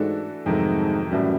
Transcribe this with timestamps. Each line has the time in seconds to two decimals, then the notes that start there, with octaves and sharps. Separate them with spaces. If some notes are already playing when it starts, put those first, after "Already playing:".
Already playing: G#2 E3 A3 D4 F#4 A4
0.46 F2 G#2 C3 D#3 F#3 A3
1.11 F#2 A2 E3 G3